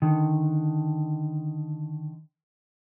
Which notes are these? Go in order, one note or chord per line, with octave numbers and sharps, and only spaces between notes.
D3 D#3